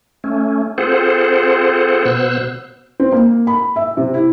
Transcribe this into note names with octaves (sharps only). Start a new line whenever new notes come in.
A3 C#4
C4 F4 G#4 A4 C5 F#5
B2 B3 C5 E6 F#6
C4
A#3
B5
E5
C3
E4